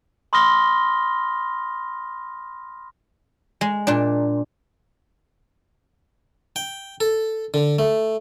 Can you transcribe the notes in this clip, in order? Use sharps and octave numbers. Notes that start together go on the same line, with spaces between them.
B5 C6 D#6 F6 A#6 G7
G#3
A#2 D4
G5
A4
D3
A3